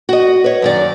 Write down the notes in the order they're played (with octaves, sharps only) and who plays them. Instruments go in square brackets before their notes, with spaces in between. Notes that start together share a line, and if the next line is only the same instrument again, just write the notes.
[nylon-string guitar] F#4 D#5
B4 C#5
F#2 D#3 D5